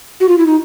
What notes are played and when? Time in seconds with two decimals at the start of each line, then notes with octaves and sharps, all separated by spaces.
0.20 F#4
0.29 F4
0.38 E4
0.47 D#4